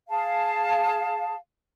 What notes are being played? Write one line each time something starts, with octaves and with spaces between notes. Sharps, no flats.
G#4 F5 A5